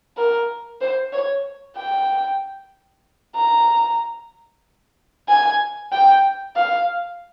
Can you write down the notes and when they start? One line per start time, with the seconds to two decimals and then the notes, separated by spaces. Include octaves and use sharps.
0.18 A#4
0.81 C5
1.13 C#5
1.77 G5
3.36 A#5
5.29 G#5
5.92 G5
6.56 F5